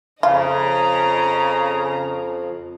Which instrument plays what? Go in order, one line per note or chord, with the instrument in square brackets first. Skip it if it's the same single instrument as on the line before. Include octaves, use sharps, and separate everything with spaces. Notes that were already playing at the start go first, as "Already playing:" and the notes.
[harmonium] F2 F3 [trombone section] C#3 [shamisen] F4 [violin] D#5 A#5